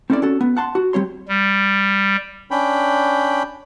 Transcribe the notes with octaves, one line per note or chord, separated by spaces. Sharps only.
C4 C#4 E4 A4 D5
C#4 F#4 A4
B3
F#5 A5 C6
F#4
G3 C4 C#5 C6
G3
C#4 D4 G5 B5